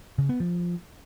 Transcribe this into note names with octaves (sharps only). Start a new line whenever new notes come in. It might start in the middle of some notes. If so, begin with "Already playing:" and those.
C#3
B3
F3